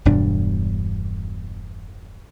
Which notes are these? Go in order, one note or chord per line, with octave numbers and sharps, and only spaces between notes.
E1 G2 B2 D4